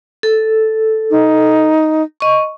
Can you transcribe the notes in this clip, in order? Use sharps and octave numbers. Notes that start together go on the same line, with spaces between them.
A4
D#4
D#5 C#6